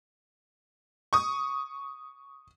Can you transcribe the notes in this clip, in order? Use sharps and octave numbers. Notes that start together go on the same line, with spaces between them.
C#6 D#6